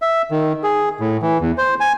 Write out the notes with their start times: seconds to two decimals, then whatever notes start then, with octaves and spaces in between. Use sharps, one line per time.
0.02 E5
0.31 D#3
0.64 G#4
1.00 A2
1.22 E3
1.41 E2
1.58 C5
1.80 G#5